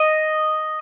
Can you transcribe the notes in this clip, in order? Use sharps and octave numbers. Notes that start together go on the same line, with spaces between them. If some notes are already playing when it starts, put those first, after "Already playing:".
Already playing: D#5